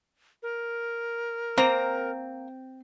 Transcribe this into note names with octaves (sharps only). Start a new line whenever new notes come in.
A#4
A#3 C4 A#5